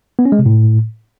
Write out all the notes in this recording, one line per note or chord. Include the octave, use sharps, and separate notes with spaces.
B3
C#4
G#3
C3
A2